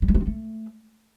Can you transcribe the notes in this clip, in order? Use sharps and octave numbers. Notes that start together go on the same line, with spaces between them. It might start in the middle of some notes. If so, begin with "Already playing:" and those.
G3
G#3
A3
C4
A3